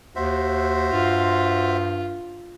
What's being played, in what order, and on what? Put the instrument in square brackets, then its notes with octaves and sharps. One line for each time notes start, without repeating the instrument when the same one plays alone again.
[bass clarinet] D#2 [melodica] F#4 C5 E5
[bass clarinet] G2 [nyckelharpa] F4